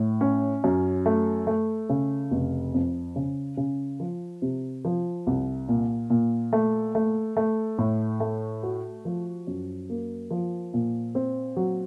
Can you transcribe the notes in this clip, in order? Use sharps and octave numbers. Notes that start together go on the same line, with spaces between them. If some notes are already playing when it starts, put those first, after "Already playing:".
Already playing: A2
C#4
F#2
A3
A3
C#3
F1
F2
C#3
C#3
F3
C3
F3
C2
A#2
A#2
A3
A3
A3
A2
A3
F#4
F3
F#2
A#3
F3
A#2
C4
F#3